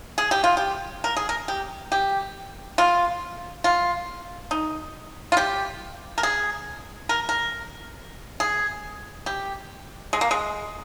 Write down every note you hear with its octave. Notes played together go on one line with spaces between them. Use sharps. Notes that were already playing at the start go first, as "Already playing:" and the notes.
G#4
G4
F4
G4
A#4
G#4
A#4
G4
G4
F4
F4
D#4
F4
G4
A#4
G#4
A#4
A#4
G#4
G4
G#3
A#3
G#3